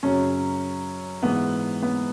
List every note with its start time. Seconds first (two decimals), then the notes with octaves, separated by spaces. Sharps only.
0.03 F#2 C#3 F#3 C#4
1.22 G#2 E3 G#3 B3
1.82 B3